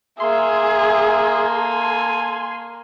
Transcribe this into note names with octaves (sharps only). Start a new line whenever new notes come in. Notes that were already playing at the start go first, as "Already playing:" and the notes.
A#3 G#4 E5 C6
A4 G#5